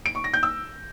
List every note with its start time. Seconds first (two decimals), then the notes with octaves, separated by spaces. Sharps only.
0.06 D7
0.15 C#6
0.24 A#6
0.34 G6
0.43 E6